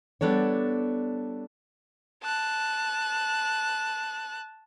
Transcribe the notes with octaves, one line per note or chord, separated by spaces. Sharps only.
G3 B3 D4 A4 C#5
A5 F#6